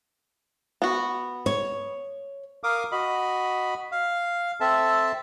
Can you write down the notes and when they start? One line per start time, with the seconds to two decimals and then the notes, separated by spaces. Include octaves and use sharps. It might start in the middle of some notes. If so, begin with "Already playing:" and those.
0.82 B3 F#4
1.46 C#5
2.64 A#4 F5 D6 D#6
2.92 F#4 D#5 B5
3.92 F5
4.60 C4 A4 E5 A5